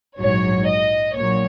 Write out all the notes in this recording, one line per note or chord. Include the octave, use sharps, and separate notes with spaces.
A#1 G#2 F#3 C#5
D#5
A#1 A#2 F#3 C#5